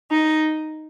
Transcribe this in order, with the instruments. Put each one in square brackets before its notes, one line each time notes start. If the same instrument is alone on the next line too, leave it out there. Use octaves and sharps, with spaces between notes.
[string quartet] D#4